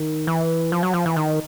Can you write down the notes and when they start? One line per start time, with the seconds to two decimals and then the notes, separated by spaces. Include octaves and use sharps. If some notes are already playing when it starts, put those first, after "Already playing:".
Already playing: D#3
0.27 E3
0.72 F3
0.83 F#3
0.94 F3
1.06 E3
1.16 D#3